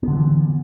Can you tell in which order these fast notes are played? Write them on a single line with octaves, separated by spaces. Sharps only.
B3 D3 F#3 E3